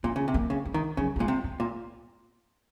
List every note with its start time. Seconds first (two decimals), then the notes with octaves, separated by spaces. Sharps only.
0.04 A#2 C#4
0.16 C#3
0.28 C3
0.34 A#3
0.50 C#3
0.65 G#3
0.74 D#3
0.97 C#3 F#3
1.16 A#3
1.20 A#2 G#3
1.28 C3
1.44 G#3
1.60 A#2